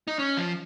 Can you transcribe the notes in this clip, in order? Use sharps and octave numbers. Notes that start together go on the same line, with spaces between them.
D#4
C#4
F3